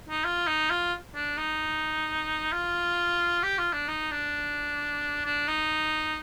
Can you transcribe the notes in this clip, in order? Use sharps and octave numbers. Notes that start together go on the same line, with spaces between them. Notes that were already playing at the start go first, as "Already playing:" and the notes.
D#4
F4
D#4
F4
D4
D#4
F4
G4
F4
D4
D#4
D4
D4
D#4